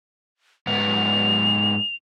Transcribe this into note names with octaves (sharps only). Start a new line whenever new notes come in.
G#2 B3 F7